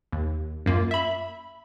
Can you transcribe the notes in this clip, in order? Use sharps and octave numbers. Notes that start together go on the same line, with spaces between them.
D#2
F#2 A#3 F4
E5 B5